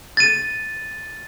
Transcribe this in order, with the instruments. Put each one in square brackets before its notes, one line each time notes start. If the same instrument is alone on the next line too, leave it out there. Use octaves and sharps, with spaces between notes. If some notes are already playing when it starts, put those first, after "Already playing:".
[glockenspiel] A6 D#7